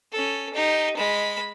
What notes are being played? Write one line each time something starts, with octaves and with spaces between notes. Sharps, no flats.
C#4 A4
D#4 G4
G#3 B5